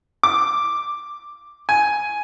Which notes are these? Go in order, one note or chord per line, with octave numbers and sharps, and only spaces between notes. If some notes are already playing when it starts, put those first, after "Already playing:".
D6
G#5